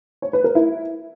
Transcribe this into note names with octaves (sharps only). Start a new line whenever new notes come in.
C#5
B4
A#4
E4